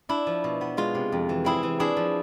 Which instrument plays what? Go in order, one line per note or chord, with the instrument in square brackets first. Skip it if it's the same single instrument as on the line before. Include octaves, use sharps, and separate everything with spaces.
[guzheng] D4 E4
F3
B2
B3
G#3 F4
C3
F2
E3
C4 E4 G#4
E3
D4 E4 G#4
F3